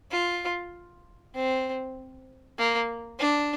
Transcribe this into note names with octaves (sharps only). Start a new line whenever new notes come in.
F4
C4
A#3
D4